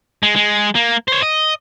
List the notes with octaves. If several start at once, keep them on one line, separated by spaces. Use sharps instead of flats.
G#3
G#3
A#3
C5 C#5
D#5